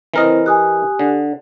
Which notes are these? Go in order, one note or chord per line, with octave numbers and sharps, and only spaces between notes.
E3 C4 E4 A#4 C5 D#5
G4 G#5 D#6 F#6
D3